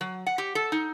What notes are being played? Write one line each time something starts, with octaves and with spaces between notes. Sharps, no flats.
F#3
F#5
G4
A4
D#4